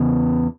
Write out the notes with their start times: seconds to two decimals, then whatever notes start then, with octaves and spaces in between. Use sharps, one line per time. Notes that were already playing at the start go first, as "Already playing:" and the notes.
Already playing: E2 C#3 E3 B3